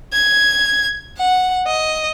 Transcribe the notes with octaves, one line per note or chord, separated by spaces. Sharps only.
G#6
F#5
D#5